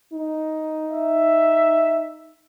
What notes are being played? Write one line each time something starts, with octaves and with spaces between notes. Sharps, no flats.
D#4
E5